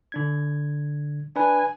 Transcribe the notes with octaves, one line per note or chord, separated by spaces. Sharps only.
D3 D4 G#6
D4 B4 G#5